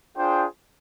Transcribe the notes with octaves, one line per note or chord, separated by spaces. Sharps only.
D4 F4 G#4 C5 G5